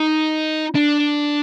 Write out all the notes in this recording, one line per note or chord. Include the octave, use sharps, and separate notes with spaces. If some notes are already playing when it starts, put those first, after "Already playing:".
Already playing: D#4
D4